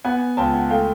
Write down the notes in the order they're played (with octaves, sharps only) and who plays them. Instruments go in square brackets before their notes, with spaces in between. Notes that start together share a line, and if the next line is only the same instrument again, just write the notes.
[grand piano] B3 F#5 G#5
C#2 G5 A5
F#5 G#5
A3 F5 G5